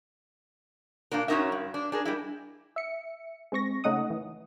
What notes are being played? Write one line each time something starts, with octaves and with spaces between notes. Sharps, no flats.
A#2 A#3 D4 A#4
F#2 F#3 C#4 D#4 A#4 E5
G2
D4
D4 G#4 A#4
G3 G#3 E4
E5 C#7
G#3 C4 C#6 A#6
C#3 A3 D#4 F#5 D#6
E3